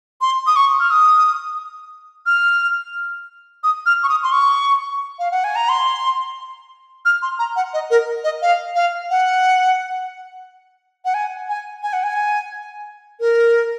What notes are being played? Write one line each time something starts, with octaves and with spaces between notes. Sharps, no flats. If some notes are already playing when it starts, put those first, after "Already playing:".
C6
D#6
C#6
F6
D#6
F6
D#6
F6
C#6
D#6
C6
C#6
F5
F#5
G#5
A#5
C6
F6
C6
A#5
F#5
D#5
A#4
D#5
F5
F5
F#5
F#5
G#5
G#5
G#5
F#5
G#5
A#4